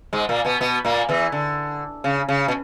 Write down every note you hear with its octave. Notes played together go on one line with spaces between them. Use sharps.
G#2 G#3
A#2 A#3
B2 B3
B2 B3
A#2 A#3
E2 E3
D3
C#3
C#3
B2